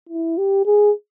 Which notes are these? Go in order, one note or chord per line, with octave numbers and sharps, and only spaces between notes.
E4
G4
G#4